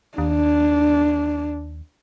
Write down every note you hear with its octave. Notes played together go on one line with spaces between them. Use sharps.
D#2 D4